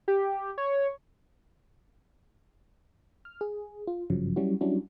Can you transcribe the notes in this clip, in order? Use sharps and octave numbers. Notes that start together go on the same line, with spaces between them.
G4
C#5
F6
G#4
F4
G#1 G2 C#3 F3 F#3
F#3 G3 C#4 E4 F#4
F#3 G3 C#4 D4 E4 F#4